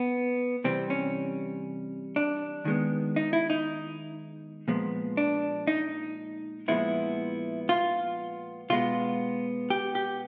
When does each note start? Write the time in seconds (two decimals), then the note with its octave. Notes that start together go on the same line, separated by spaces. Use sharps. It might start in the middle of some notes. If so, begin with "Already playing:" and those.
Already playing: B3
0.64 C3 E3 G3 C4
0.90 C#4
2.16 D4
2.65 D#3 G#3 B3
3.16 D#4
3.33 E4
3.50 D#4
4.68 A#2 F3 G#3 B3
5.17 D4
5.67 D#4
6.68 A#2 F3 G#3 B3 E4
7.69 F4
8.70 B2 G#3 B3 F4
9.70 G4
9.95 G4